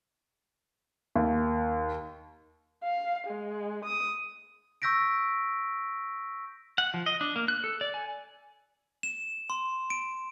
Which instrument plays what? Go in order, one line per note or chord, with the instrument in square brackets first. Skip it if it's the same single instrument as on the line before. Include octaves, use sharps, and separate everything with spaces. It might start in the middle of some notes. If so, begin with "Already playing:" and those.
[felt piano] D#2
[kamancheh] F5
G#3
D#6
[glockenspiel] C#6 E6 G6 A#6 B6 D7
[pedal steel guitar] F#5
F3
D#5
D4
A#3
F#6
A4
D5
G#5
[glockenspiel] E7
C6
D7